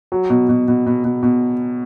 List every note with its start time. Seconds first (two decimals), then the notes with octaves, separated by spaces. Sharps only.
0.12 F#3
0.30 B2
0.49 B2
0.68 B2
0.86 B2
1.04 B2
1.23 B2